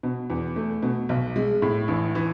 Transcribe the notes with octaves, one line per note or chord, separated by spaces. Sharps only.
B2
E2
A3
B2
B1
G#3
A2
A1
E3